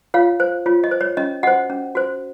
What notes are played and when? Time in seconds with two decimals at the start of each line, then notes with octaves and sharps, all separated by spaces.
0.14 F4 C#5 F5
0.40 C5
0.66 F4 C#5
0.84 D#5
0.91 C5
1.01 C#5
1.17 C#4 D#5
1.43 F#4 C5 D#5 F#5
1.70 C#4
1.95 F#4 C5